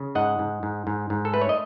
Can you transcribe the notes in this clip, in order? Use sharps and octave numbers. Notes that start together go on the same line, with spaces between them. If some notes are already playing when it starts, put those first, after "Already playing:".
Already playing: C#3
G#2 D#5 F#5
G#2
G#2
G#2
G#2
A4
A3 B4
C#5
D#5